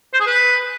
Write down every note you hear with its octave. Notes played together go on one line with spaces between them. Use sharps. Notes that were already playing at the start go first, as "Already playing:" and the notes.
C5
G#4
B4